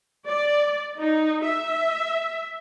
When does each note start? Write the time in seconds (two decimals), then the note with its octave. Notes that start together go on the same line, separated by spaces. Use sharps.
0.27 D5
0.98 D#4
1.44 E5